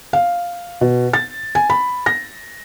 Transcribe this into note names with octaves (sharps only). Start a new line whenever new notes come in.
F5
B2
A6
G#5
B5
A#6